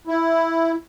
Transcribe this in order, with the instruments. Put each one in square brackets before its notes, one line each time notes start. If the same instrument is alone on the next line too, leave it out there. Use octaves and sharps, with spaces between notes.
[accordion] E4